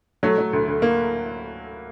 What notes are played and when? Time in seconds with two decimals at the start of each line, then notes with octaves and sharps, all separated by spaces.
0.23 F#3 A3
0.38 F#3
0.53 D2
0.68 D2
0.82 A#3